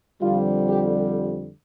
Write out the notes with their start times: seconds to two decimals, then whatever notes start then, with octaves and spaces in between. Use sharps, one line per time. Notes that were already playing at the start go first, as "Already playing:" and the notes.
0.21 F2 D3 G3 F4
0.68 G4